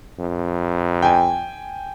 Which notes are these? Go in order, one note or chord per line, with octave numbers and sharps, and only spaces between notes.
F2
G5 G#5